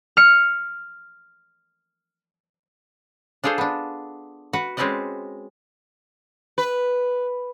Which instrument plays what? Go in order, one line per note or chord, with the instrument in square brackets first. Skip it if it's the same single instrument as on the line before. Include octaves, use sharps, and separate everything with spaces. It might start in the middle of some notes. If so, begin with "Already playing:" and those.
[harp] F6 C#7
[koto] D4 F4 G#4 A4 C5
B3 D4
F#4 B4 F#5
G#3 C4 C#4 B4 D5 D#5
[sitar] B4